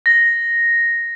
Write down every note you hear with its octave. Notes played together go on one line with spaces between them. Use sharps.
A#6